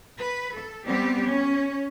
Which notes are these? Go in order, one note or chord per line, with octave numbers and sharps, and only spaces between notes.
B4
A4
G3 B3 C4 G4
C#4